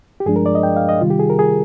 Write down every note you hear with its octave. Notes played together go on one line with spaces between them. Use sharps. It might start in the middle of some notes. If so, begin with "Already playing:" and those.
G4
G2 F3 G#3 D4 G#4
A#4
D5
D#5
G5
F5
D#5
C3 D#3 G3 F4
G4
G#4
A#4
G#4